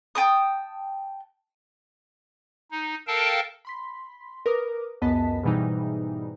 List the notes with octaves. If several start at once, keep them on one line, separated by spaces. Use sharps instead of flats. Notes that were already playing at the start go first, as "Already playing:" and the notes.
G5 A5 D#6
D#4
A4 A#4 F5 G5 A5
B5 C6 B6
A#4 B4 D6 D#6
C#2 F#2 B3 D#5 A5 B6
G#2 B2 E3 G3 D#4